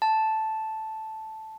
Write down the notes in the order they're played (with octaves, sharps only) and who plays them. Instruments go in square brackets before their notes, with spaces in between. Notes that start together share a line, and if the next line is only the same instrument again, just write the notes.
[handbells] A5